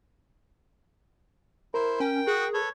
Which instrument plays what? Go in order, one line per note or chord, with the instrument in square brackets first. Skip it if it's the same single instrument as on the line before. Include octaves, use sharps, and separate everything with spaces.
[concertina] E4 C5 [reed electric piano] A#4
[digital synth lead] C#4 [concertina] G5
[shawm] F#4 [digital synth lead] G#4
[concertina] A4 B4 [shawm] C#5